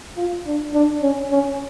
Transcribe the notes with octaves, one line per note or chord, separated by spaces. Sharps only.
F4
D4
D4
C#4
C#4